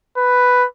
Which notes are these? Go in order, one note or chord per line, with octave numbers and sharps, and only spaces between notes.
B4